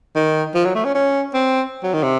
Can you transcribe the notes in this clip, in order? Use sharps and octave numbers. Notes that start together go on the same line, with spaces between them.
D#3
F3
F#3
A3
C#4
C#4
C4
F#3
D#3
C3